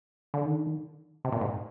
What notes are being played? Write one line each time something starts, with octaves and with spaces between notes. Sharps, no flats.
D3
D#3
C3
A#2
G#2